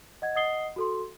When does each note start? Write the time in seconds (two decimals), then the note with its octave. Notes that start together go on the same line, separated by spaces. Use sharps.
0.22 D#5 F#5 G#6
0.35 D#5 F#5 D#6 C7 G7
0.76 F#4 A4 C6